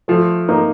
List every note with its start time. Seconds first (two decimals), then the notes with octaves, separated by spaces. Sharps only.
0.08 F3 A3
0.48 A#3 D#4